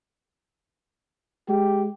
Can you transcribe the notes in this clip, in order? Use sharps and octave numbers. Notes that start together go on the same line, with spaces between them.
G#3 G4